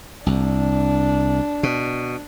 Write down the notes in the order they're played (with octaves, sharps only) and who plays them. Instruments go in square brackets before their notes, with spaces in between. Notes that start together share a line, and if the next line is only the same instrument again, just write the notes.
[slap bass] C2 [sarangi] D4
[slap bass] B2